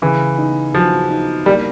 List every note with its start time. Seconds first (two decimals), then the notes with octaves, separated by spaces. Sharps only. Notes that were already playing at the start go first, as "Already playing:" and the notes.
0.02 C#3 E3
0.38 D#4
0.74 F3 F#3
1.10 D#4
1.46 G3 A#3